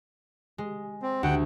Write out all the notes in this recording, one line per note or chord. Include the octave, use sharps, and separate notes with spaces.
G#3
C4
D2 F#5 G5